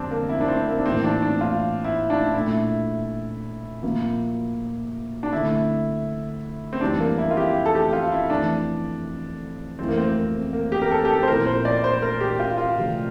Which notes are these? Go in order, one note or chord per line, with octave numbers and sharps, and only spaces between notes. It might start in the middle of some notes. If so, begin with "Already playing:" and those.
Already playing: F2 D3 G3 C4 D4
A#3
E4
D4
C4
A#3
D4
A2 E3 A#3 C4
D4
D4
F4
E4
D4
A#2 A3 D4 E4
A#2 F3 A#3
D4
D3 A3 C4 E4
C4
F2 E3 G3 D4
A#3
E4
F4
G4
A4
G4
F4
E4
F2 E3 A3 D4
F2 E3 A3 C4 E4
A#3
C4
A#3
G4
A#4
A4
G4
A4
C5
A#2 F3 C4 E4 A#4
C5
D5
C5
A#4
G4
F4
F4
C3 F3 A3